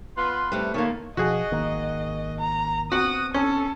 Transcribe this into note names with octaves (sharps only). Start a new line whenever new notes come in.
B3 F4 B4 C6
C3 G3 A3 B4
D#3 G3 A3 A#3 F4 C#5
B2 F3 F#4 G#4 D#5
G#1 D#3 A#3
A#5
B3 C4 F#4 F#5 D#6
C#4 A4